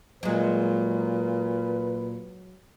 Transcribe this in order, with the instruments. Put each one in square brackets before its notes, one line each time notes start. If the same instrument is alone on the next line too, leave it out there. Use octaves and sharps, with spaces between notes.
[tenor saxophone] A#2 [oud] F#3 G#3 [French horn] B4